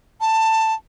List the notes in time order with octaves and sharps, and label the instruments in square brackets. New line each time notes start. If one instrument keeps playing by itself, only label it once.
[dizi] A5